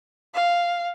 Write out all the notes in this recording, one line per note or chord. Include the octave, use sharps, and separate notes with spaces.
F5